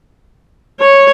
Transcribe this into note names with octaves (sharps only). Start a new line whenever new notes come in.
C#5